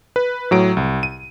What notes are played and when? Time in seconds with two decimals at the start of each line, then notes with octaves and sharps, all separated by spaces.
0.16 B4
0.51 A2 F#3 D7
0.77 C2
1.03 D#7